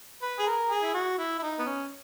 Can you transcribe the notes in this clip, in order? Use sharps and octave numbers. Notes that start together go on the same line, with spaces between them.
B4
G#4
A#4
G#4
E4
F#4
E4
E4
D#4
B3
C#4